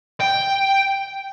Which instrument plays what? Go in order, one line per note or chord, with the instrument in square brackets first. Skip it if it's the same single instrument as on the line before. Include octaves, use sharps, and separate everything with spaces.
[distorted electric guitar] G5